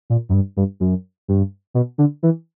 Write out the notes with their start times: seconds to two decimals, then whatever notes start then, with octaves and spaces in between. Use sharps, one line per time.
0.10 A#2
0.29 F#2
0.33 G2
0.57 G2
0.80 F#2
1.28 G2
1.74 B2
1.98 D3
2.23 E3